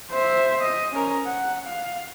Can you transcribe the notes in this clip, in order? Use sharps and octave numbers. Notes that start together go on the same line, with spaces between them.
C5 E5
D#5
C#4 A#4
F#5
F5